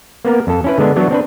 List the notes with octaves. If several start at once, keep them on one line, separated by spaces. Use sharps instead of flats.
A#3 B3 A#4
F2 A4
C#4 E4 B4
D3 G#3 B3 D4
E3 F#3 B3 D4 F#4 C#5
C4 D4 B4